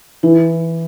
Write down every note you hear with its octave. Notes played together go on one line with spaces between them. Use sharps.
E3 E4